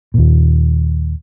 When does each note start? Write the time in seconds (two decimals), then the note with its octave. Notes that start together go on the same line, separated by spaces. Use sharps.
0.14 D#2 A#2